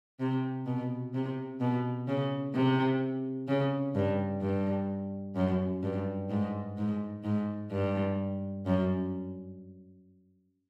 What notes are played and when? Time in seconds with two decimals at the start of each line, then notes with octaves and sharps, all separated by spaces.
0.20 C3
0.66 B2
1.14 C3
1.60 B2
2.08 C#3
2.54 C3
3.48 C#3
3.95 G2
4.42 G2
5.36 F#2
5.83 G2
6.30 G#2
6.77 G#2
7.24 G#2
7.72 G2
8.66 F#2